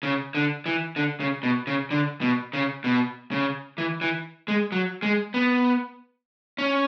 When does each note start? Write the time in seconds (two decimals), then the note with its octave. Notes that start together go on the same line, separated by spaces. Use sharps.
0.03 C#3
0.35 D3
0.66 E3
0.96 D3
1.20 C#3
1.43 B2
1.67 C#3
1.91 D3
2.21 B2
2.53 C#3
2.84 B2
3.31 C#3
3.78 E3
4.01 E3
4.48 G#3
4.72 F#3
5.02 G#3
5.34 B3
6.58 C#4